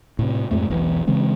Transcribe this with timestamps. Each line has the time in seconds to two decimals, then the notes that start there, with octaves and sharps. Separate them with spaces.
0.19 A2 C3
0.51 F2 G#2 A3
0.70 E1 B1 B2 E3
1.07 C#3 E3 G#3 C4